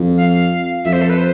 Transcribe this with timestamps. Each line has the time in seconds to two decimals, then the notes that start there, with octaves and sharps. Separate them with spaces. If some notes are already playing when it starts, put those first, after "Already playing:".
Already playing: F2
0.17 F5
0.85 F2 E5
0.93 C5
1.01 A4
1.10 B4
1.18 C5